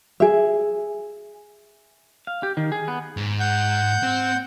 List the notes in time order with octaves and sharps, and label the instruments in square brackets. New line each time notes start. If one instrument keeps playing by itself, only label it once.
[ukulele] G#4 E5
[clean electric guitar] F5
G4
D#3
G#4
B3
[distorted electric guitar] G#2
[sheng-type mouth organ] F#5 G6
[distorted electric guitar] C4